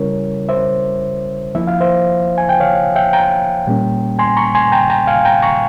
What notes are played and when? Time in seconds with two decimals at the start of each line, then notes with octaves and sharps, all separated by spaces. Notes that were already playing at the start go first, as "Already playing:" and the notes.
Already playing: C#3 G3 C#4 E4 A#4 C#5
0.49 C5 E5
1.55 F3 A#3 E4 E5
1.67 F5
1.80 C5 E5
2.38 G#5
2.49 G5
2.60 C#5 F5
2.96 E5 G5
3.13 G5 A#5
3.67 A#2 G3 A#3 C#4
4.19 G#5 C6
4.37 A#5 C#6
4.55 G#5 C6
4.72 G5 A#5
4.90 G5 A#5
5.07 F5 G#5
5.25 G5 A#5
5.42 A#5 C#6